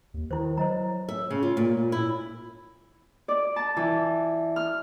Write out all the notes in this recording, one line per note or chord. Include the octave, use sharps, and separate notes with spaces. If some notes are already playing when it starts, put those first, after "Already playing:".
D#2
D#3 E4 C5
F#3 C5 D#5 A#5
E5
C#3
F4
A#2
E4
D5
A5
E3
F6